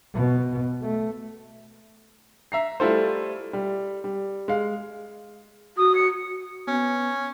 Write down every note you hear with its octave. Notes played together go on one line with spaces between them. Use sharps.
B2
A3
E5 A#5 C7
G3 A3 E4 F4 A4 C5
G3
G3
G#3 F5
F#4 D#6
C#7
B3 C#4